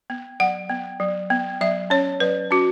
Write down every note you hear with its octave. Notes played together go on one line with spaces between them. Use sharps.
B3
F#3 F#5
B3
F#3
B3
F#3 E5
C#4 C#5
F#3 B4
C#4 F#4